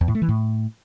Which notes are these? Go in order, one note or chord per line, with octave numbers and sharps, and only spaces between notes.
E2
A2
A3
E3
A2